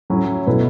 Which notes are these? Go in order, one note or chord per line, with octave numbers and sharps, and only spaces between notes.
A2 F#3 C#4 E4
B2 A3 E4 B4